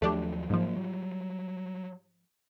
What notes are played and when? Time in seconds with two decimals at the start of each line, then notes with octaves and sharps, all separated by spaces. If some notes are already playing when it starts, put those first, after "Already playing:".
0.02 D#2 F3 F#3 A3 D4 G4
0.50 G#2 F3 F#3 A#3
0.77 F#3 G3